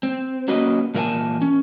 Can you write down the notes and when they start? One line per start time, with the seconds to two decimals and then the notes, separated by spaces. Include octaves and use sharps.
0.03 C4
0.48 F#3 A#3 C#4 F#4 B4 D#5
0.95 A#2 E3 A#4 E5 G#5 A5
1.42 C#4